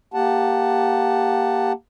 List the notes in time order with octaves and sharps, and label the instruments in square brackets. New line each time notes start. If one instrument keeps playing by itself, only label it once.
[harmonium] A#3 G4 F#5 A5